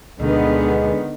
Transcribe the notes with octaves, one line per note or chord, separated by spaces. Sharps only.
D2 B2 D3 D#3 G#3 B3